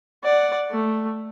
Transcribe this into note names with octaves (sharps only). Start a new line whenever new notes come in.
D5 F#5
A3